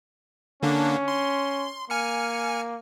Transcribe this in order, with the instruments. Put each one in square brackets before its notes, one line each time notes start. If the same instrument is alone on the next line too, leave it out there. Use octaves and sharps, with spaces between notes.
[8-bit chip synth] D3 A#3 D4 [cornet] C#4
[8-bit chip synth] C6
[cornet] A#3 [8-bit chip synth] G#5 F6 C#7